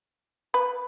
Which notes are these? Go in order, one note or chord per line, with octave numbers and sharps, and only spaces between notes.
B4